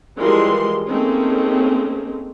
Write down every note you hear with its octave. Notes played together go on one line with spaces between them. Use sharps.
E3 F3 G3 G#3 A#4 C6
A3 A#3 C4 C#4 D#4 G#4